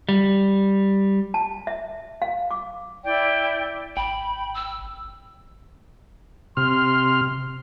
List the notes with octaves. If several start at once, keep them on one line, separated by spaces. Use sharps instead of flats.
G3
A5
E5
F5
D6
E4 D5 G5
G#1 G5 B5
E6
C3 C6 F6